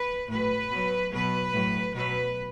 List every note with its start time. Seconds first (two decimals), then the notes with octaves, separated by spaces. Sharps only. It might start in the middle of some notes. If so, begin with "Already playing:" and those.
Already playing: B4
0.28 A2 F#3 B4
0.69 B2
0.75 F#3
1.11 B2 F#3 B4
1.53 A2 F#3
1.94 B2 F#3 B4